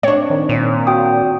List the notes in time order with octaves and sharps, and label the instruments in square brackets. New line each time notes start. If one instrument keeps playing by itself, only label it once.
[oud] C4 D4 [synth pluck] C#5
[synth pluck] D#3
[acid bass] A#2
[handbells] F#4 G5 D#6